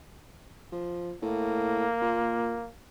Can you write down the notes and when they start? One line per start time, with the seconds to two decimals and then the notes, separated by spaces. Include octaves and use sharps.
0.72 F3
1.22 A2 A#3
2.02 A#2